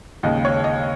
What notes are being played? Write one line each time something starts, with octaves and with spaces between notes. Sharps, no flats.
D#2 C#3 G#3 D#5
C#5
D#5